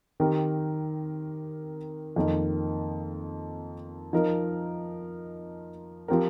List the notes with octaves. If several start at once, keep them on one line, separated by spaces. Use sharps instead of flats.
D#3 C4 G4 A#4
F2 D#3 A#3 D#4 A#4
F3 D#4 A#4
F3 C4 G4 A#4